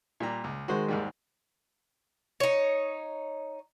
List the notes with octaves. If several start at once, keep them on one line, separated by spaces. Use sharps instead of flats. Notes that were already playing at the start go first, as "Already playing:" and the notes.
A#2 G3 A#5
C#2
D#3 G#3 F#4 C5
D#2 G#2 G3
D#4 C#5